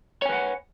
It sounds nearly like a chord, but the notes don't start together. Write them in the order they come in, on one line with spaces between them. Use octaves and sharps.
C#5 G#5 B4 F#5